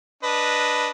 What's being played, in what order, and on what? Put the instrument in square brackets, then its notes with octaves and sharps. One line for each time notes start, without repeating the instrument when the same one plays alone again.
[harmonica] D4 B4 D#5